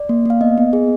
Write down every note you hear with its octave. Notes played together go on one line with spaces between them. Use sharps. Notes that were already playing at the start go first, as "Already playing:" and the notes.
Already playing: D5
A#3
A#3 F5
B3 D#5
B3
G#4